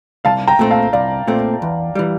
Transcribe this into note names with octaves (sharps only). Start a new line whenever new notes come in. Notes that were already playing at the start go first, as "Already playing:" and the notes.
C2 F5 A5
G5 A#5
A#2 A3 C4
F5 A5
C2 D5 F5
A#2 A3 C4
E2
E3 G3